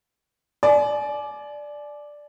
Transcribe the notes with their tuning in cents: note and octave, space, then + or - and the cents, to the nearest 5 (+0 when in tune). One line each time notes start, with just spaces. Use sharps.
D5 +0 G#5 +40